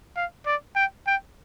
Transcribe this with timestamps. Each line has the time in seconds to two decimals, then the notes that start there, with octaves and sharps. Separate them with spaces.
0.16 F5
0.46 D5
0.76 G5
1.07 G5